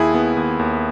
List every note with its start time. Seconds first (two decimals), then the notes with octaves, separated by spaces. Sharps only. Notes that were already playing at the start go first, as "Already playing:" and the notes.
Already playing: D#2 E4 G#4
0.14 B3
0.37 D#2
0.59 D#2